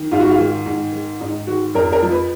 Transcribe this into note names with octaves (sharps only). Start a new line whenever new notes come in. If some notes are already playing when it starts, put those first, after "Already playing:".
Already playing: D#3
G#2 F4
F#4
F4
D#3
G#2
D#3
G#2 D#4
D#3 F#4
F2 A#4
A#4
F3
B4